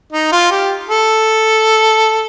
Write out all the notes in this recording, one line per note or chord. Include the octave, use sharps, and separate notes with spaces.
D#4
F4
G4
A4